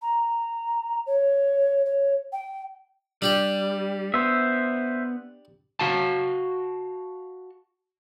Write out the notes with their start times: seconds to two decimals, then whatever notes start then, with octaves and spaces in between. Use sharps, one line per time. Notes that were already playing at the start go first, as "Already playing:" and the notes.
0.02 A#5
1.06 C#5
1.86 C#5
2.32 G5
3.22 G3 D4 G4 D5
4.14 B3 C5 E5
5.79 F#4 F5 A5